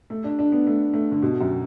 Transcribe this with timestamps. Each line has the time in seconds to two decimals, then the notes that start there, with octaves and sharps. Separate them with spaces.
0.10 A3
0.24 D4
0.39 D4
0.52 B3
0.67 A3
0.94 A3
1.12 D3
1.22 B2
1.41 F#2